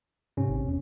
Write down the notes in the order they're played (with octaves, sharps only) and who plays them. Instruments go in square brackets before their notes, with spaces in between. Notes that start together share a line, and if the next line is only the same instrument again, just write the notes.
[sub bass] G#2 [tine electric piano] C3 C#4
[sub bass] G#1
E2